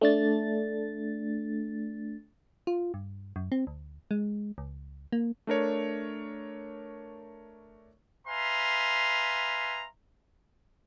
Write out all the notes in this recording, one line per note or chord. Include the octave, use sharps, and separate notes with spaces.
A3 D4 A6
F4
G2
F#2
C4
D2
G#3
C#2
A#3
A3 D4 A#4 C#5
B4 E5 F5 G#5 A#5 C6